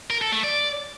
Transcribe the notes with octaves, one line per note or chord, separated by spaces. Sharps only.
A#4
A4
A3
D5